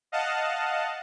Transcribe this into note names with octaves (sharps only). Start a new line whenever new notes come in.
D#5 F5 F#5 A5